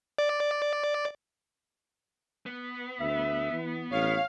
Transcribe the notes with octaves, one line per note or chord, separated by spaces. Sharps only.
D5
B3
D2 E5
E3
A1 C#5 F5